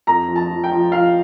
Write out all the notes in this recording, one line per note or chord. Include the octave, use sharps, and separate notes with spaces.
F2 A#5
F3
A5
F3
G5
F3
F3 F5